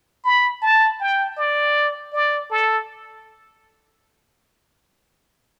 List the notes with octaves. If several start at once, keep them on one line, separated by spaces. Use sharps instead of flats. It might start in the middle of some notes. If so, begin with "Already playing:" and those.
B5
A5
G5
D5
D5
A4